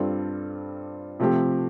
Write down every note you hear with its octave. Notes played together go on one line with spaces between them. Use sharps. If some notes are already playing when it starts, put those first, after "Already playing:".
Already playing: G2 G3 C4 F4 A4
C3 F3 A3 C4 G4